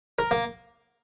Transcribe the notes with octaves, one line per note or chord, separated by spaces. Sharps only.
A#4
A#3